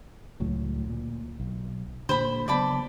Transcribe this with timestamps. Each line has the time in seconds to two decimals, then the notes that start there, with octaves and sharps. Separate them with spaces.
0.40 C#2 A2 F#3
0.86 D2 A#2
1.40 B1
2.09 A#2 D3 C5 B5
2.48 C#3 F#3 B3 D5 A5 B5